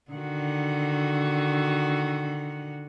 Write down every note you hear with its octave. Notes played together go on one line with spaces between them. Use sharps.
D3 D#3 F#4